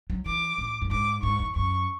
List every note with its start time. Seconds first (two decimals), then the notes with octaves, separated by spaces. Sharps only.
0.10 F#3
0.26 E3 D6
0.58 A2
0.82 F#2
0.91 G#2 D6
1.23 G#2 C#6
1.39 E2
1.56 F#2 C#6